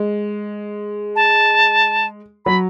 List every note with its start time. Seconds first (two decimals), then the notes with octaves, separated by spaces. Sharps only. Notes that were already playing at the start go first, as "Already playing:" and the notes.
Already playing: G#3
1.16 A5
2.45 F#3 B5